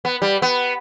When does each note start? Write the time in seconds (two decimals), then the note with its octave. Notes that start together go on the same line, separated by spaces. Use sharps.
0.05 B3
0.22 G3
0.42 B3